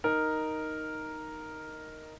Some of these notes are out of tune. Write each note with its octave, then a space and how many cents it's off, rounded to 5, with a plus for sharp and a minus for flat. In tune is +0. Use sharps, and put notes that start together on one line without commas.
D#4 +0 A#4 +0